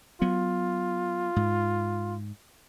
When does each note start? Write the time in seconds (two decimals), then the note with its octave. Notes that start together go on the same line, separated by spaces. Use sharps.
0.22 F#3 B3 F4
1.36 G#2